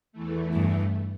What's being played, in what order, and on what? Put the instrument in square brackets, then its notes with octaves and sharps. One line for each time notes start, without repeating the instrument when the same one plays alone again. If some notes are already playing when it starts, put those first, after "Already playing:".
[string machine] E2 E3 A3
[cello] G2